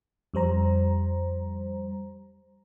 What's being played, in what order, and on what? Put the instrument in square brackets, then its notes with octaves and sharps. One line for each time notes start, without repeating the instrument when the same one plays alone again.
[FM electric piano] F2 G3 C5 A#5